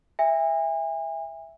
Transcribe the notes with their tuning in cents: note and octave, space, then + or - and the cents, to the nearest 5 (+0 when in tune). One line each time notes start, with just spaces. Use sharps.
E5 +0 G#5 -40